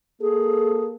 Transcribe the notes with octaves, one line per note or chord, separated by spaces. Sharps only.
A#3 G#4 A4